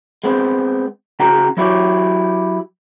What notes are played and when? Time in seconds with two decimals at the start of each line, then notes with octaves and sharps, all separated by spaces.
0.24 G#3 B3 C4
1.20 C#3 F#4 G5 A#5
1.57 F#3 E4 F#4 G4 C#5